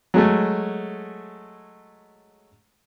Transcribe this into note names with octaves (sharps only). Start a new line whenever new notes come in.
F#3 G#3 A3